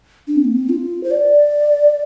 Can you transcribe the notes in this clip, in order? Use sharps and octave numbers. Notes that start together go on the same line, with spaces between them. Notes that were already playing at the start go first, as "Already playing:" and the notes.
D4
C4
A#3
C4
F4
C5
D5